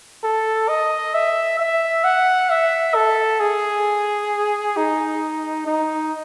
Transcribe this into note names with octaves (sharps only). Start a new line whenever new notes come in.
A4
D#5
E5
E5
F#5
E5
A4
G#4
D#4
D#4